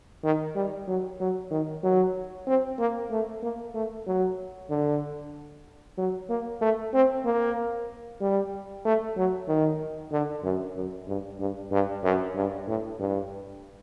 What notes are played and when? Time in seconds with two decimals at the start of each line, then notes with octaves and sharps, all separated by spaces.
0.24 D#3
0.55 G3
0.88 F#3
1.20 F#3
1.51 D#3
1.83 F#3
2.47 C4
2.79 A#3
3.11 A3
3.43 A#3
3.74 A3
4.07 F#3
4.70 D3
5.98 F#3
6.30 A#3
6.61 A3
6.94 C4
7.25 A#3
8.21 G3
8.85 A3
9.17 F#3
9.48 D#3
10.12 D3
10.44 F#2
10.76 F#2
11.08 G2
11.40 G2
11.72 G2
12.04 F#2
12.35 G2
12.68 A2
12.99 G2